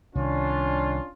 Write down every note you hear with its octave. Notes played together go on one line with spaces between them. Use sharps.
C2 D#3 C#4 D4 F4